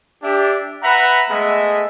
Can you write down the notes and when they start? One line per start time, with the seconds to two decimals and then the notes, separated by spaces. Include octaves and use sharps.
0.23 D4 G4 E5
0.84 B4 E5 F#5 A#5 B5
1.30 G#3 A3 B3 G#4 D#5 E5